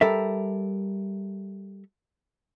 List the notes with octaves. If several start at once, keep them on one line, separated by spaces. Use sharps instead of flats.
G3 A4 A#4 E5